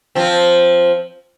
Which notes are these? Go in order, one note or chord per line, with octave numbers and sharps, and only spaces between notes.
F3 C4